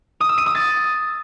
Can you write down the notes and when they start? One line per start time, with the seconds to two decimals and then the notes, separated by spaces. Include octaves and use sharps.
0.20 D#6
0.29 E6
0.38 D#7
0.46 D#6
0.55 A6